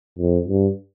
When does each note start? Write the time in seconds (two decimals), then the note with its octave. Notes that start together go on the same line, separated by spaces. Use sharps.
0.19 F2
0.48 G2